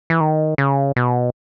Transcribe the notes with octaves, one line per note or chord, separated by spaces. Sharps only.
E3
D#3
C#3
B2